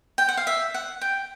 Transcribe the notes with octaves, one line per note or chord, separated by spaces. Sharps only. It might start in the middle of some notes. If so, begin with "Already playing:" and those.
G5
F#5
F5
E5
F#5
G5